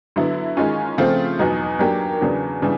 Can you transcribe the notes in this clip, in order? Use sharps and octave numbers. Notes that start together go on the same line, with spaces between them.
D3 F#3 B3 E4
D#3 G#3 C#4 F4
C#3 F3 A3 C4 F4
E2 B2 F#3 B3 D#4
F#3 A#3 D4 G4
E2 C#3 F#3 B3 D4
C#3 E3 G3 D4